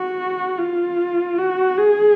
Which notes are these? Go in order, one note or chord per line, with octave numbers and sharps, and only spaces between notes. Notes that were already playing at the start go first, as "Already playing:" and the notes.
Already playing: F#4
F4
F#4
G#4